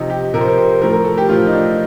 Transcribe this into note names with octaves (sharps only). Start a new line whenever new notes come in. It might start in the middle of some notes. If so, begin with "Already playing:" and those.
Already playing: C3 F3 D#4
G4
C3 F3 A#4
C5
A#4
C5
A2 F3 A#4
A#4
A4
G4
A2 F3 F4
D#4
D4